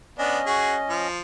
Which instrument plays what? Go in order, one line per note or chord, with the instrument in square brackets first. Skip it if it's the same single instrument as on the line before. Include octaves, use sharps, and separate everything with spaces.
[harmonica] B3 D4 [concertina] C#4 D#5
[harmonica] F#4 G#4
F3